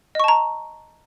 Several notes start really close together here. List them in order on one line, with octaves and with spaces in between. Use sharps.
D#5 C#6 A5 A#5